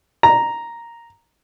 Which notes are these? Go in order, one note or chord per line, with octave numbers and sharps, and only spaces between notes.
A#5